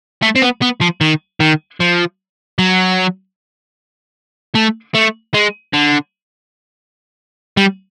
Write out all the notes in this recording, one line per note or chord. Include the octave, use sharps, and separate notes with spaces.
A3
C4
B3
B3
F3
D#3
D#3
F3
F#3
A3
A3
G#3
D3
G3